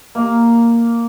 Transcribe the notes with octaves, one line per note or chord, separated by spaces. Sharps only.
A#3